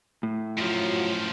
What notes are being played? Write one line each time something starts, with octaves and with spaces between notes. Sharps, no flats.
A2
F#2 F3 F#3 F4